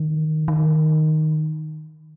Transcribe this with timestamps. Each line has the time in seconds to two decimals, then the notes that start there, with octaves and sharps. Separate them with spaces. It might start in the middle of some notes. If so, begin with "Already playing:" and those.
Already playing: D#3
0.48 D#3